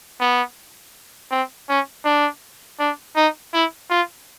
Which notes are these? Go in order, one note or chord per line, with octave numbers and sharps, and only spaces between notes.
B3
C4
C#4
D4
D4
D#4
E4
F4